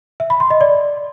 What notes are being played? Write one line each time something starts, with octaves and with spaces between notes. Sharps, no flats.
E5
B5
C6
D#5
D5